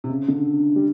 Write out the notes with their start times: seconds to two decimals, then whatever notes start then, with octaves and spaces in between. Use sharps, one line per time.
0.04 C3
0.10 C#3
0.28 D3
0.76 G3